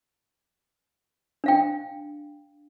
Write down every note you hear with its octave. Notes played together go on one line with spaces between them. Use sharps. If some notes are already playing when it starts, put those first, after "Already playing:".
D4 F5 G5